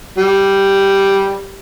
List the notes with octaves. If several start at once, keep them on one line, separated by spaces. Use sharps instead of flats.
G3